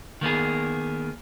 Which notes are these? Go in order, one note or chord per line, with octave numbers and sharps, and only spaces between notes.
D#3 A#3 B3 G#4